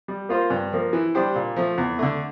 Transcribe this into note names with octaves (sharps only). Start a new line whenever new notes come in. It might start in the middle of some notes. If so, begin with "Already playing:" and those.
G3
A#3 F4 C5
G2
F3 A#3
E3
G3 D4 G4 C5
A#2
F3 A3
E2
D3 A3